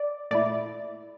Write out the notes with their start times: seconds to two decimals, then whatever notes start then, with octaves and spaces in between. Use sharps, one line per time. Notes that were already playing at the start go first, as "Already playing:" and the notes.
Already playing: D5
0.31 A#2 A3 E4 D5